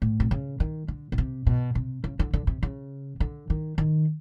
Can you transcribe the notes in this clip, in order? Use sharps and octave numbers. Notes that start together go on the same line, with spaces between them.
A2
C3
C#3
D#3
D3
B2
C3
B2
C3
C#3
D3
D3
C3
C#3
D3
D#3
D#3